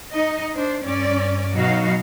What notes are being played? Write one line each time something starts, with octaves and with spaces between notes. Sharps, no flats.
D#4 D#5
D4 C5
G2 C#4 D5
B2 F#3 D#4 F#4 F5